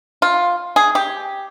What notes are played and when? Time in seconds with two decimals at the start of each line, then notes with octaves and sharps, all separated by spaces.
0.22 F4
0.76 G#4
0.95 G4